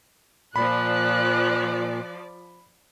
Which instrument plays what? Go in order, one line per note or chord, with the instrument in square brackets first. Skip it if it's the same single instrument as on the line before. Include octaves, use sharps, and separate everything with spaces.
[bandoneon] A#2 [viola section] F3 D5 [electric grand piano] B5 [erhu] F#6